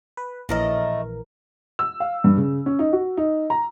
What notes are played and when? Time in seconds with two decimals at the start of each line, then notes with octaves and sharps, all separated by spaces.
0.17 B4
0.49 A#1 A2 E3 A3 A#4 D#5
1.79 E6
2.00 F5
2.24 G2
2.37 C#3
2.66 C#4
2.79 D#4
2.93 F#4
3.17 D#4
3.50 A#5